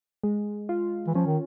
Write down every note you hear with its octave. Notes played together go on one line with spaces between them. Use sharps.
G#3
F4
E3
F3 C#4
D#3